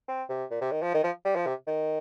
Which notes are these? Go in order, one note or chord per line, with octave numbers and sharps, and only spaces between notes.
C4
C3
A#2
C3
D#3
F3
D#3
F3
G3
F3
C3
D#3